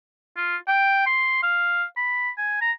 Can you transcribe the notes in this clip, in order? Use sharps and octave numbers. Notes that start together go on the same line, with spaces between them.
F4
G5
C6
F5
B5
G#5
A#5